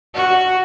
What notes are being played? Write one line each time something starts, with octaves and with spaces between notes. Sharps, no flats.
F#4